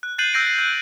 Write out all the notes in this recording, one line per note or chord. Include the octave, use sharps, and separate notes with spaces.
F#6
F#6 G6 A6 C7 D#7 F#7
E6 G6 A#6 C7 D7
C7
F#6